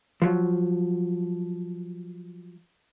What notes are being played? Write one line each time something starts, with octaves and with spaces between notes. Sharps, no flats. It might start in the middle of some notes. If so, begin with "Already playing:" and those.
F3 F#3